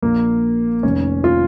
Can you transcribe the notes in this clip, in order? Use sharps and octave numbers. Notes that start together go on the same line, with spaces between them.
A#1 A#2 A#3
F1 F2 D#3 C#4
F4